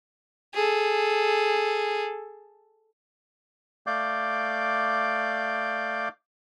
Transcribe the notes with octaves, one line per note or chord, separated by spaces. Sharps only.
G#4 A4
A3 D5 F5 D6 G6